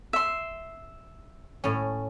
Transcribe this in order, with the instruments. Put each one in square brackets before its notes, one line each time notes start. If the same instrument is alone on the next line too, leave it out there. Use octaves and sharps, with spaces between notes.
[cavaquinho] E5 C6
[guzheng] A2 C#4